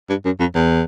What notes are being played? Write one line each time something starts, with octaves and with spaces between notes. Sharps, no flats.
G2
F#2
F2
E2